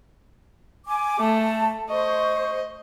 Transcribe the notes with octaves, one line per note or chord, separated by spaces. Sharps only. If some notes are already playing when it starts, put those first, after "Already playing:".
G#5 D6
A3 A5
C5 D#5 C#6